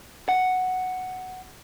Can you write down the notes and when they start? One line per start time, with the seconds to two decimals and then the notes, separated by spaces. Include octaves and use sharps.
0.29 F#5